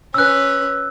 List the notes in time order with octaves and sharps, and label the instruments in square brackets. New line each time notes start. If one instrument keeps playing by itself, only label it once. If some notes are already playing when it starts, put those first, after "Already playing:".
[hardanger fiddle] C#4 B4 [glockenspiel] E6 F#6